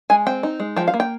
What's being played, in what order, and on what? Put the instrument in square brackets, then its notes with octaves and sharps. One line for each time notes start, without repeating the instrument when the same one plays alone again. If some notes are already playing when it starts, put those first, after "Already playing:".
[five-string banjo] G#3 G#5
C4 G5
D#4
G#3
F3 G5
F5
A#3
G5